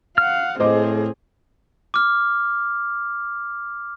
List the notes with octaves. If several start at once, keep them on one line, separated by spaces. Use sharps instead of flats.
F5 F#5 F6
A2 C4 G#4 C5 D#5 D6
D6 F6